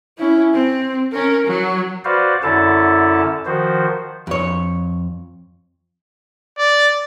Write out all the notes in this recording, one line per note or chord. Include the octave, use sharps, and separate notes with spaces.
C#4 E4
C4
C#4 A#4
F#3
F#4 B4 C5 D5 F5
F#2 D3 C#4 E4 A4 A5
D#3 F3 F#4 C5
F2 C#5
D5